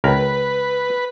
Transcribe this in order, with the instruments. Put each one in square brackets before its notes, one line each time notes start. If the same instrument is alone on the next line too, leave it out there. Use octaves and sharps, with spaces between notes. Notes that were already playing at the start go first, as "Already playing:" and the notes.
[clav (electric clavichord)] C#2 A#4 [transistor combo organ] B4